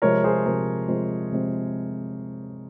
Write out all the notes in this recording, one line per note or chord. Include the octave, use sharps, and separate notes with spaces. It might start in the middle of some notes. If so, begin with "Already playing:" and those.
C3 F3 G#3 C4 A#4 C#5
G#4 C5
C3 F3 G#3 C4 A#4
C3 F3 G#3 C4
C3 F3 G#3 C4